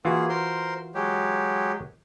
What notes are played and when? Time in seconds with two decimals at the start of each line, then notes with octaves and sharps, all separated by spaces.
0.05 E3 A#3 F4 F#4 G#4
0.29 A#4 C5 C6
0.94 F#3 G#3 G4